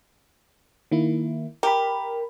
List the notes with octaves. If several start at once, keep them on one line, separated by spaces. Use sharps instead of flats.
D#3 A#3 E4
G4 A#4 B5